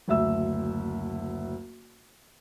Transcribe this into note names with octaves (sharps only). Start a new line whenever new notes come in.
F#1 D2 E5 E6